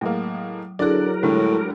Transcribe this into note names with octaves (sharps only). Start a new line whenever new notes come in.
A2 F#3 G#3 A#3
D3 F#3 E4 G#4 A#4 D5 F#6
A2 D3 G3 G#3